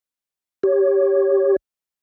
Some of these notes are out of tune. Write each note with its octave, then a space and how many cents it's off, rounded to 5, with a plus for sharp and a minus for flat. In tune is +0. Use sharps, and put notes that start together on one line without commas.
G4 +0 C#5 +0